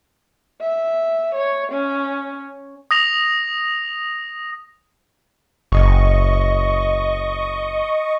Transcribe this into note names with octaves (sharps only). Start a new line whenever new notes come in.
E5
C#5
C#4
D#6 A#6 F7
F#1 D#5 C#6